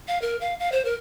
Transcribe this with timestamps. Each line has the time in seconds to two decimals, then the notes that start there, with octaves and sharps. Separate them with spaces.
0.08 F5
0.22 A#4
0.41 F5
0.59 F5
0.72 C5
0.85 A#4